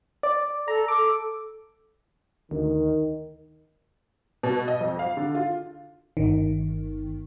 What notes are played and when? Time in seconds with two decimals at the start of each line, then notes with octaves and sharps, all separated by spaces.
0.23 D5
0.68 A4 A#5
0.88 A4 D6
2.51 D2 D#3
4.43 B2
4.68 D#5
4.81 F2
4.99 F5
5.17 D3
5.35 F4
6.17 G1 D#3